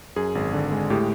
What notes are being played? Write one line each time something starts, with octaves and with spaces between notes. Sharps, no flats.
F#2 G#4
G#1
D3
G#3
A2 G4